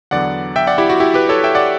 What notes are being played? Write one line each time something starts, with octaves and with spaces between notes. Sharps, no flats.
E2 D3 F#3 B3 D5 F#5
E5 G5
D5 F#5
E4 G4
F#4
E4 G4
G4 B4
A4 C#5
E5 G5
D5 F#5